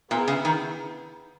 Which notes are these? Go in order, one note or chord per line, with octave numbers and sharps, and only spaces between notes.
A#2 B3 E4 G#4
C#3
D#3